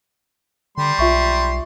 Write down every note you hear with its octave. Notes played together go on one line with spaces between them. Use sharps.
D3 G3 C6
B1 F4 E5 C#6